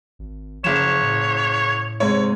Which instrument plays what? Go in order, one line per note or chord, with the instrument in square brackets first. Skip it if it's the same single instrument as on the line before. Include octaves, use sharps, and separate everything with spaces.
[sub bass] G#1
[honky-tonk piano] F#1 E7 [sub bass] F3 [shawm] C#5
[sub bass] A2
[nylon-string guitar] G#2 C3 G#3 [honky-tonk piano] C#5